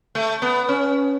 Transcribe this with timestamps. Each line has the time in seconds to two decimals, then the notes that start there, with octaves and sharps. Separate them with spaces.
0.15 A3
0.42 B3
0.69 C#4